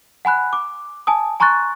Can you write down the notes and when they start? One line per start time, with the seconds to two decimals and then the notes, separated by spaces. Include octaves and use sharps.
0.25 F#5 G#5 B5 F#6
0.53 D6
1.07 G#5 A5 D#6
1.40 G#5 A#5 C6 C#6 F#6 A6